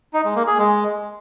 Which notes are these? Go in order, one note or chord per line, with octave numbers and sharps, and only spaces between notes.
D#4
G#3
A#3
G#4
G#3